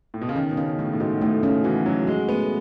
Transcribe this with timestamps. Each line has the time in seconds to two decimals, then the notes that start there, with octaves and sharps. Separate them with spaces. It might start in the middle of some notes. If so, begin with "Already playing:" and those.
0.14 A2
0.22 B2
0.29 C#3
0.36 D#3 C#4
0.51 B2
0.57 C#3 C#4
0.79 A2 A3
0.93 A2
1.00 G#2 F#4
1.21 A2 A3
1.43 C#3 C#4
1.64 E3 F#4
1.86 F#3 C#4
2.07 G#3 F#4
2.29 A3 B3